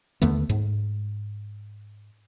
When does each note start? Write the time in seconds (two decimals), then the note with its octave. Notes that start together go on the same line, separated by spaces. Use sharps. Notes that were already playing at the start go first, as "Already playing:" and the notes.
0.22 D#2 D3 A3 B3
0.49 G#2